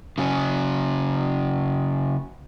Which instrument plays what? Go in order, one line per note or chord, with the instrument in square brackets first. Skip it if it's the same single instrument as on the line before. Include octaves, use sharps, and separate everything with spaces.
[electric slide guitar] C#3 F#3 C#4